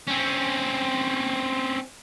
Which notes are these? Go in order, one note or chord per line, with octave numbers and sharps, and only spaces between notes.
C4 C#4